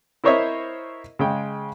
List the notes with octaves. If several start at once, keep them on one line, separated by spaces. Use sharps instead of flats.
E4 A#4 C5 C#5 D#5 E5
C#3 G#3 G5